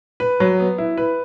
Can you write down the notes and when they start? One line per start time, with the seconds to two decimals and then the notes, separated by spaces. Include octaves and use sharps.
0.20 B4
0.40 F#3
0.60 B3
0.78 E4
0.97 B4